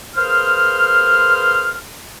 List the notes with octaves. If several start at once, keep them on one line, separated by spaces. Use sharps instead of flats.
A#3 G#4 B4 C5 C6 F6